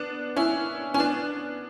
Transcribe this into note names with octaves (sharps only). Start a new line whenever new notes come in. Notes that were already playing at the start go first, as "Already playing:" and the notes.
Already playing: B3 D4
C#4 E4
C#4
B3 D4